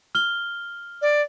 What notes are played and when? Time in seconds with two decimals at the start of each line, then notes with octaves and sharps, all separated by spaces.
0.15 F6 G7
1.02 D5